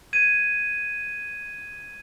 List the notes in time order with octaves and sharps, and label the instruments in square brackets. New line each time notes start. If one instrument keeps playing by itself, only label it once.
[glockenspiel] G#6 D#7